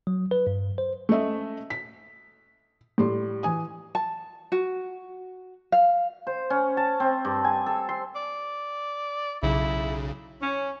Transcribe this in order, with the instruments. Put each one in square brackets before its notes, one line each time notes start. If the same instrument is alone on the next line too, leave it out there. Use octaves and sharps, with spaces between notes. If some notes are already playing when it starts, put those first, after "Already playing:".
[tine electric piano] F#3
B4
G2
C5
[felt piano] A3 C#4 D#5 E5
B6
A2 G3 C6
E3 G#5 D#6
[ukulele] A5
F#4
F5
[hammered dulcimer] C5
C#4
A5
C4
G2
G#5
A4
C6
[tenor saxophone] D5
[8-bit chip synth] B1 C#3 [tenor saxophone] E4
[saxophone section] C#4